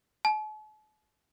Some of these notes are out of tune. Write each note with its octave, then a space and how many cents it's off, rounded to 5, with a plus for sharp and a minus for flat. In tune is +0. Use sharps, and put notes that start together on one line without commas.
A5 -45